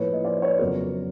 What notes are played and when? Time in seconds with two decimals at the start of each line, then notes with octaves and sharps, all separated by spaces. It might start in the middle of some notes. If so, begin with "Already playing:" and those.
Already playing: A2 F3 A#3 B4 C#5
0.13 D#5
0.24 C5 D5
0.42 B4 C#5
0.59 F2 C#3 F#3 B3 A#4